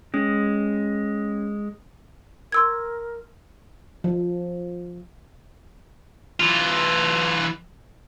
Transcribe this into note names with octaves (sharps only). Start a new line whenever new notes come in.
G#3 C#4
A#4 C6 E6 G#6
F3
E3 F4